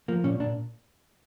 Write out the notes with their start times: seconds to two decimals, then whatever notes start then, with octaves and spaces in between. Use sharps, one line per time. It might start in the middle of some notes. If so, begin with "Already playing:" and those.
0.08 F3 A#3
0.24 A#2 C#4
0.40 A#2 D4